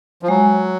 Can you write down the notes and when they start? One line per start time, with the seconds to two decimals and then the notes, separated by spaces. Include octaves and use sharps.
0.23 F3
0.28 F#3 G#3